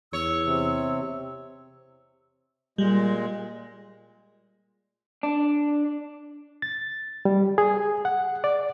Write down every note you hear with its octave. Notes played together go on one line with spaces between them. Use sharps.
E2 C#5 E6
C3
A#2 G3 G#3
D4
A6
G3
G#4
F#5
D5